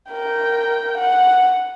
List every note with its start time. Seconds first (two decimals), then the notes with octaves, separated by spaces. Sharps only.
0.10 A#4 G5
0.97 F#5